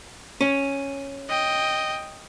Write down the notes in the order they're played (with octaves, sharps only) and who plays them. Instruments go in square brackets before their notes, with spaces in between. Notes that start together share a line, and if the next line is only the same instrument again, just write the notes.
[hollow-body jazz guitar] C#4
[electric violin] D#5 G5